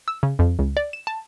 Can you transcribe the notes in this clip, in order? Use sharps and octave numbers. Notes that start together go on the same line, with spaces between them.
E6
C#3
F2
C#2
D5
E7
A5